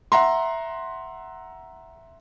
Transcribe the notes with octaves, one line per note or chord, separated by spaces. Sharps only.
E5 F#5 A#5 C6